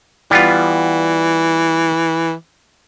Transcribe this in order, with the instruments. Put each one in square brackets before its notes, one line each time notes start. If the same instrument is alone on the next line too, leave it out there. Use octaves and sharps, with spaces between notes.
[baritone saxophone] E3 [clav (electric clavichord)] G3 B3 F4